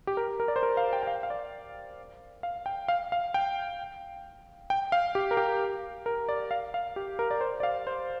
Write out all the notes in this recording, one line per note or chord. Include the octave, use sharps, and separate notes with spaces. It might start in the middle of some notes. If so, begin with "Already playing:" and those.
G4
A#4
A#4
D5
C5
A#4
F5
G5
G5
F5
F5
D5
F5
G5
F5
F5
G5
G5
F5
G4
A#4
G4
A#4
D5
F5
F5
G4
A#4
D5
C5
D5
F5
C5